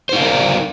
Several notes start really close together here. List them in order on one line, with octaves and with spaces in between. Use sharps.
C5 D#4 F5 A#4 D5